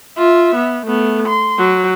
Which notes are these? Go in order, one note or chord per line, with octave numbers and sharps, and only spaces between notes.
F4 E5
B3
A3 B3
C6
F#3